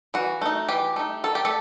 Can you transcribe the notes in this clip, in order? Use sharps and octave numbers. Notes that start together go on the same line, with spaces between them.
E3 F#4
A3 D#4
E3 G4
A3 D#4
D#3 A4
G4
A3 A4